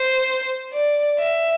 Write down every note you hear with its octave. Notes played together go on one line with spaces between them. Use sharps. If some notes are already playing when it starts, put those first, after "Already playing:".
Already playing: C5
D5
E5